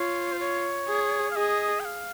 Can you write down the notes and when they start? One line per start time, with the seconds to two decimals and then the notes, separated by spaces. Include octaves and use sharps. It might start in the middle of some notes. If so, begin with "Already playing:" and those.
Already playing: F4 C#5
0.32 C5
0.40 C#5
0.88 G#4
1.31 F5
1.36 G#4 D#5
1.80 G5
1.85 F5